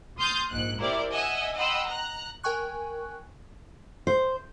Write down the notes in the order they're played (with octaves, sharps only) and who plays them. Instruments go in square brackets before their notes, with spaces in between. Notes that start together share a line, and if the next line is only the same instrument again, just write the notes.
[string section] C6 D#6 F6 G6 A6
A#1 G#2 F#6
E4 G4 A#4 C5 D5
D#5 E5 F#5 G#5 E6
D#5 F#5 G5 B5 C6 E6
A#5 F#6
[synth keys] A#4 G5 G#5 C#6 F#6
[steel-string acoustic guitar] C5